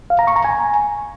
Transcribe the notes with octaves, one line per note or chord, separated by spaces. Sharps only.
F5
A#5
C#6
A#5
G#5